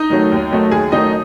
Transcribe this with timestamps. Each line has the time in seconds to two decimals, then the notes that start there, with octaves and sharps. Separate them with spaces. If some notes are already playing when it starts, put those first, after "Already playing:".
Already playing: D#4 D#5
0.10 D#3 F#3 A3
0.31 D#2
0.52 D#3 F#3 A3
0.71 D#2 G#4
0.92 D#3 F#3 A3 D#4 D#5